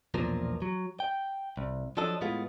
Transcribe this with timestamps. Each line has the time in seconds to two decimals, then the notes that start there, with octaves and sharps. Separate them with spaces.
0.14 B1 E2 A#2 F3 D4 A#4
0.62 F#3
1.00 G5
1.57 C2
1.97 F3 F#3 D4 A4 D#5
2.21 A2 G#3 B3 F4